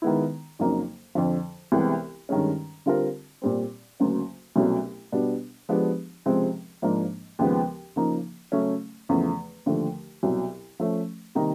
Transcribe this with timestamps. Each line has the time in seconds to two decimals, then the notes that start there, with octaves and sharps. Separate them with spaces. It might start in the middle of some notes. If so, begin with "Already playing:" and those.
0.02 D#3 G#3 B3 E4
0.59 F2 C#3 F#3 A#3 D#4
1.15 F2 D3 F3
1.72 C2 C3 E3 G#3 B3
2.29 G2 D#3 G#3 C#4
2.86 D3 G3 C4 F4 A#4
3.42 A#2 G3 C4
4.00 D2 C#3 F#3 A#3 C#4
4.56 C2 B2 F#3 A3 C#4
5.12 B2 G3 B3 D4
5.69 F3 G#3 B3 D4 G4
6.26 C#2 C3 F3 G#3 C4
6.82 G#2 F3 A#3 D4
7.39 D#2 C#3 F3 G#3 B3
7.96 C#3 F3 A#3 D#4
8.52 C#3 F#3 A3 C#4
9.09 E2 C#3 F3 A3
9.66 D#2 D3 F3 A3
10.23 C2 B2 F#3
10.80 F3 A3 C#4
11.35 C3 D#3 G3 A#3 D#4